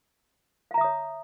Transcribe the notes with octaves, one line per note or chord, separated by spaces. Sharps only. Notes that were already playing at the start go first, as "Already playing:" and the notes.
C#5 E5 F5 A#5 D#6